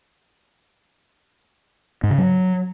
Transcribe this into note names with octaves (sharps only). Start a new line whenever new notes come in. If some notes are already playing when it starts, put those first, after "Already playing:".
G#2
C#3
F#3